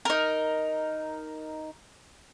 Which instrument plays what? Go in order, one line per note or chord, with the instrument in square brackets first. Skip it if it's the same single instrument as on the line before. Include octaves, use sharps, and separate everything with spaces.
[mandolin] D#4 A#4